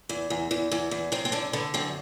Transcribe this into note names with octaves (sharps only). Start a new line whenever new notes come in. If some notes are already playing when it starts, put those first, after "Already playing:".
E2
E2
E2
E2
E2
F#2 C4
C4
D3 D4
D3 B3
F#2 C4